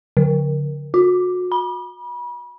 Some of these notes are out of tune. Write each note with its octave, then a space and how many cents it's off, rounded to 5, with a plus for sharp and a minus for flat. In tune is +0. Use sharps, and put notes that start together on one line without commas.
D3 -25
F#4 -35
B5 -35